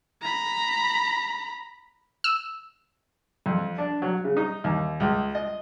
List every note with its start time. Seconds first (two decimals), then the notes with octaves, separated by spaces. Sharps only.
0.22 A#5 B5
2.24 E6
3.46 F2
3.78 D4
4.02 F#3
4.24 C#3
4.37 D#4
4.64 D#2
5.00 C#2
5.35 D#5